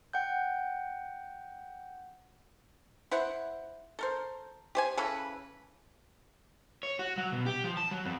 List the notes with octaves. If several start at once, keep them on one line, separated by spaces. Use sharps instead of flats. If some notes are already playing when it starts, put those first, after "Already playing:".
F#5 G5 G6
E4 C5 F#5
A4 A#4 C5
G4 C5 G#5
C#3 E3 A4 B4
C#5
F#4
F#3
B2
G4
F3
A5
F#3
F2